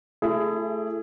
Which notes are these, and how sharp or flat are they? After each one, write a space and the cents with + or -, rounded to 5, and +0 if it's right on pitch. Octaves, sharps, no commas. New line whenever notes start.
A3 +0 E4 +35 G#4 +0